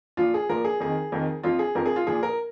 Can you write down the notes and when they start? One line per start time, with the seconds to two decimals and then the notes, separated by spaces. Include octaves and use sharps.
0.17 A#2 F3 F4
0.34 G#4
0.49 A#2 F3 A#4
0.65 G#4
0.80 F2 D#3 G#4
1.12 F2 D#3
1.43 F2 F3 F4
1.59 G#4
1.75 F2 F3 A#4
1.86 G#4
1.96 F4
2.07 A#2 F3 G#4
2.23 A#4